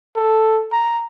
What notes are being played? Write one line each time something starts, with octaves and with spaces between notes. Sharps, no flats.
A4
A#5